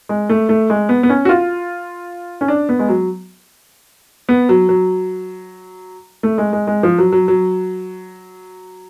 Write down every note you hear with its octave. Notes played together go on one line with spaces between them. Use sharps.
G#3
A3
A3
G#3
B3
B3
C#4
F#4
F4
C#4
D4
B3
G#3
F#3
B3
F#3
F#3
A3
G#3
G#3
G#3
F3
F#3
F#3
F#3